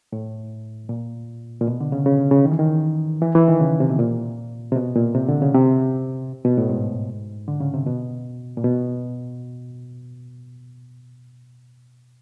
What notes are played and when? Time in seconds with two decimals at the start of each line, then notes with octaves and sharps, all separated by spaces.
0.13 A2
0.89 A#2
1.61 A#2
1.67 B2
1.81 D3
1.92 C#3
2.06 C#3
2.31 C#3
2.45 D#3
2.52 E3
2.59 D#3
3.22 E3
3.35 E3
3.48 D#3
3.60 C#3
3.80 C3
3.90 B2
3.99 A#2
4.72 C3
4.76 B2
4.95 A#2
5.15 C3
5.28 D3
5.42 C#3
5.54 C3
6.45 B2
6.58 A2
6.70 G#2
7.48 D3
7.61 C#3
7.74 C3
7.87 B2
8.57 A#2
8.64 B2